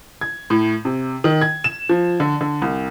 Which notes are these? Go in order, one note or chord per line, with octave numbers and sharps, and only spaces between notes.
G#6
A2
C3
D#3
G#6
E7
F3
D3
D3
C2